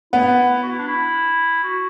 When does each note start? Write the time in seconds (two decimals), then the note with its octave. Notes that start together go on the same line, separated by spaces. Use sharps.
0.13 B3 E4
0.63 F#4
0.72 E4
0.79 D4
0.87 E4
1.64 F#4